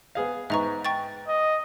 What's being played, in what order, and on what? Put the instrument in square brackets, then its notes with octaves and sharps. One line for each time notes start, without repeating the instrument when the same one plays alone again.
[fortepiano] B3 G#4 F5
[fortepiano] G#2 B3 [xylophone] E5 A#5 C#6
[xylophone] G5 C#6 A6
[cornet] D#5